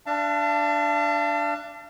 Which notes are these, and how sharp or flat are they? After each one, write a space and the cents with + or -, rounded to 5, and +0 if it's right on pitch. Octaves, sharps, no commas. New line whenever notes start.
D4 +0 F5 -40 A5 +30